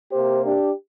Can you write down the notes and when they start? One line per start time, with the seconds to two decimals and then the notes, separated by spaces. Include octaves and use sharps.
0.11 C3 A#3 G4 C5
0.43 D4 G4